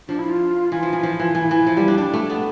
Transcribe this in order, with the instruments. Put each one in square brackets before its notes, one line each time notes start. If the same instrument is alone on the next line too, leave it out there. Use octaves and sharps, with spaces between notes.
[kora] F3 [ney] D4
[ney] E4
F4
[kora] E3 [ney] F4
[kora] F3
E3
F3
E3
[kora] E3 [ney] E4
[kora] E3
F3
G3
D4
D4
A3
B3